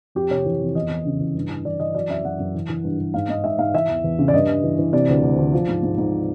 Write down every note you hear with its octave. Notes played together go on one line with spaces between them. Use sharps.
F2 G4
C3 C#5
E3
F2
E2 D#5
E2
C#3
E3
G2
E3
E3 D5
E3 D#5
F#3 D5
F#2 E5
F#2 F#5
F#2
E3
E3
G2
G2
G#2 F5
G#2 D#5
G#2 E5
G#2 F5
E3 E5
E2
E2
C#3
D5
G2 D#5
G2
E3
E3
C3 D5
D2
D2
D2
F3
G#2
G#2
G#2